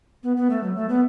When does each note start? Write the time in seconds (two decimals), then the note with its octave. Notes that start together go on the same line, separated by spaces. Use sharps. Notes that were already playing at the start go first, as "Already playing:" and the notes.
0.23 B3
0.37 B3
0.50 A3
0.63 F#3
0.76 A3
0.89 B3